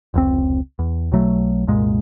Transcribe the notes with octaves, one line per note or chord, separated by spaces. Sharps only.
F1 C#2 C4
E2
B1 B2 F#3 A3
C2 F#2 A#2 G#3